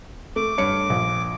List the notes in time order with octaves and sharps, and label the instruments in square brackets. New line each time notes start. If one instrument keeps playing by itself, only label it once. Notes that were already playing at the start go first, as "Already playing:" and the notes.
[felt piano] A3 [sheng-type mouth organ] D6
[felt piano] G2 C#5 C#7
A#1